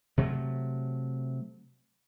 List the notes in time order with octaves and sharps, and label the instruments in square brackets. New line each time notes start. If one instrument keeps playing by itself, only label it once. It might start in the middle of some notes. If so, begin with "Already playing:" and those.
[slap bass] C3 F#3 A3